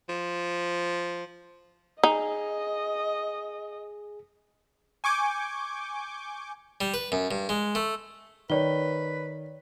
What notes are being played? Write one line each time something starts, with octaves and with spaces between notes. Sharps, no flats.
F3
D#4 G#4 D#5
G#5 C#6 D6 G6
G3
B4
F#2
G2
G#3
A3
D#3 B4 C#5 D5 G7